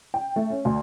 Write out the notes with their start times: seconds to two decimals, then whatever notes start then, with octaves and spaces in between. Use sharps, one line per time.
0.14 G5
0.36 A3
0.50 C#4
0.65 D2